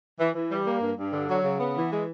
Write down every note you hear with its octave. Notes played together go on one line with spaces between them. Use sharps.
E3
E3
G3
A#3
G2
G2
D3
F#3
C#3
B3
E3
G#3